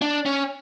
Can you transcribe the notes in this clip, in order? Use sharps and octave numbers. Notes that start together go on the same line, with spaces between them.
D4
C#4